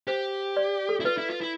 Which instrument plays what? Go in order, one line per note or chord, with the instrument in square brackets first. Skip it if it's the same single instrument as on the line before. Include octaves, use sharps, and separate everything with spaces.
[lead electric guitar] G4 [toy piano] C5
[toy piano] D5
A4
[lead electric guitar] E4
[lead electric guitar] F4 [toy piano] B4
[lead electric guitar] E4
F4
E4